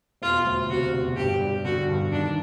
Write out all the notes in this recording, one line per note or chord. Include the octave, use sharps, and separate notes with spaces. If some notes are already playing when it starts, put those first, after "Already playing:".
E1 F4
D2
C3 F#4
E1
G2 G4
G3
D3 F#4
G2
D#3 D4